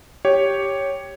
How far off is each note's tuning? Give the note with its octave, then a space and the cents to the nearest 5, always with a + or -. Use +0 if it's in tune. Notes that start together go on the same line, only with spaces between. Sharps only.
G4 +0 C#5 +0